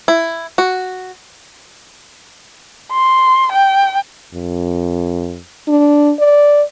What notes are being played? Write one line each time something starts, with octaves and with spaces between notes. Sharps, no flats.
E4
F#4
C6
G5
F2
D4
D5